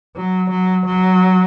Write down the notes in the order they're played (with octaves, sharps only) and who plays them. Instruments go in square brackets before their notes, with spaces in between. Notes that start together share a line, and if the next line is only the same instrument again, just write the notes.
[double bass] F#3
F#3
F#3